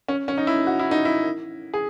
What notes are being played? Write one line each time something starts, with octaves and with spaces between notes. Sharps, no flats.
C#4
C#4
D#4
E4
F#4
E4
D#4
E4
G#4